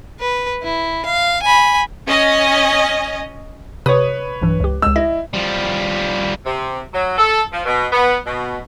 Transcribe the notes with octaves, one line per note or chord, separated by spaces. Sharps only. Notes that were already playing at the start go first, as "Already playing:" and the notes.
B4
E4
F5
G#5 B5
C#4 D#5
C3 B4 C#5 D#6
B1 G2 E3
C#2 G4
C#2 G#3 E6
E4 D#5
F3 G3
C3
F#3
A4
F3
B2
B3
B2